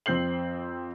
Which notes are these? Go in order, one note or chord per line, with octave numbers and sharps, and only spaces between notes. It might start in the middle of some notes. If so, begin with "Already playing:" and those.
F2 C4 G6 C7 F#7